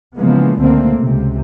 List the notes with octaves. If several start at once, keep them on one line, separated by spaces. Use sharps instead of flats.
C#3 E3 F3 G#3 A#3 B3
C#2 A#2 D3 A3 A#3 C4
C#2 C3